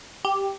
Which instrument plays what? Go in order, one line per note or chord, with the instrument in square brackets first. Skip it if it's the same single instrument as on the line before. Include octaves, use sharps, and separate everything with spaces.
[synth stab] G4